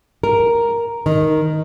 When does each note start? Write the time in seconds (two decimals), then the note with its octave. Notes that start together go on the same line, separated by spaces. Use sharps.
0.23 A#4
1.06 D#3